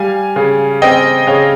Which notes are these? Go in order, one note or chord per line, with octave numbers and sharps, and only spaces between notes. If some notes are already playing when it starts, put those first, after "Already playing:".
Already playing: G3 F5 G#5
C#3
C4 D#5 G5
C#3 C#5 F5